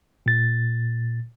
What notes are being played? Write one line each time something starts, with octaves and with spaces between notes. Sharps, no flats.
A#2 A6